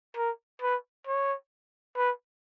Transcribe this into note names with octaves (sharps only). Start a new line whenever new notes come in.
A#4
B4
C#5
B4